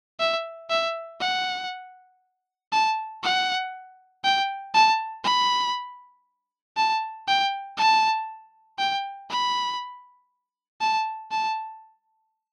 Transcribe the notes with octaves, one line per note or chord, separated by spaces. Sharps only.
E5
E5
F#5
A5
F#5
G5
A5
B5
A5
G5
A5
G5
B5
A5
A5